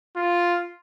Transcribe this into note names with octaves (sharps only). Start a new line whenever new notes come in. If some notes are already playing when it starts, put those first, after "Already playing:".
F4